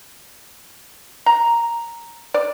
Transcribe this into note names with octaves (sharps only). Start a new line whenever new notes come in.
A#5
D5